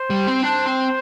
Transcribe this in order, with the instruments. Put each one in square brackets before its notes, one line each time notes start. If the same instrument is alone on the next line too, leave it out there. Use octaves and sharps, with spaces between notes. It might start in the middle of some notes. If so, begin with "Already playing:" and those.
Already playing: [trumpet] C5
[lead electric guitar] G3
C4
[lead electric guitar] D4 [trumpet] C5
[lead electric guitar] C4